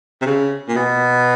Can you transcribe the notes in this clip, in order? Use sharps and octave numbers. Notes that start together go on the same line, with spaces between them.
C3
C#3
A#2
B2